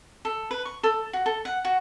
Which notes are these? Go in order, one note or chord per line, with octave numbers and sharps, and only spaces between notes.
A4
B4
C#6
A4
F#4
A4
F#5
F#4